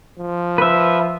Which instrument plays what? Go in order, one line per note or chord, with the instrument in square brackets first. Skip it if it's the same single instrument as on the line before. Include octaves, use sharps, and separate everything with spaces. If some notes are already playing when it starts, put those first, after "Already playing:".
[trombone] F3
[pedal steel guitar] B4 E5